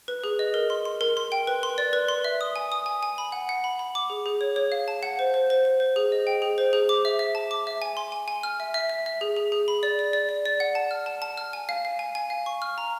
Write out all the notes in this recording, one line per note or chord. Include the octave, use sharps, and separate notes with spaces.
B4
G#4
D#5
A#4
C6
C6
A#4
C6
G5
B4
C6
D5
B4
C6
E5
D#6
G#5
D#6
G#5
G#5
B5
F#5
F#5
B5
B5
D6
G#4
G#4
C#5
C#5
F5
A5
F#5
C5
C5
C5
C5
C5
G#4
D#5
G5
G#4
C5
G#4
D6
E5
E5
A5
D6
E5
G#5
C6
G#5
G#5
F6
E5
E5
E5
E5
G#4
G#4
G#4
B5
D5
D5
D5
D5
D5
F#5
A5
F6
A5
A5
F6
G#5
F5
F5
G#5
G#5
F5
C#6
F6
A#5